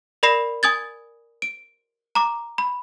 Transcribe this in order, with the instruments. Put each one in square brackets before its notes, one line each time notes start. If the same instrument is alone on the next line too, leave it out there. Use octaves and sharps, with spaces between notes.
[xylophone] A#4 D5 B5 A#6 C7 E7
G#5 D#6 G#6 A6
D7
A#5 D6
B5